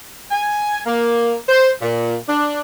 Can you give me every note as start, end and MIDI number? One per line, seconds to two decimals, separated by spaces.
0.31 0.81 80
0.86 1.35 58
1.49 1.72 72
1.82 2.16 46
2.29 2.60 62